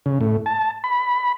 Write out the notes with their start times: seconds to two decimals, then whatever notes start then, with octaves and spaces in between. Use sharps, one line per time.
0.06 C#3
0.21 A2
0.46 A5
0.84 B5